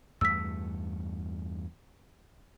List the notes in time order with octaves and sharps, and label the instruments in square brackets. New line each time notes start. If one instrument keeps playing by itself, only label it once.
[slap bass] E2 G2 A3 [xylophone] E6 B6